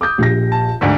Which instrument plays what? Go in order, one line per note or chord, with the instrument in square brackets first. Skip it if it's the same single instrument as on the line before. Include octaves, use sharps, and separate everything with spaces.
[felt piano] D6 D#6 G6
A#1 G4 A#6
[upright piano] A5
[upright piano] D2 G#2 D3 [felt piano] B6